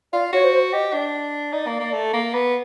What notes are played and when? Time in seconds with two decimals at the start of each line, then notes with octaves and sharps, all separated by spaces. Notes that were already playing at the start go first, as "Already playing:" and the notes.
0.13 F4 D5
0.33 F#4 C#5
0.43 C5
0.53 C5
0.73 G4 D#5
0.94 D4
1.53 D#4 D5
1.67 A#3
1.80 A#3
1.93 A3
2.14 A#3
2.34 B3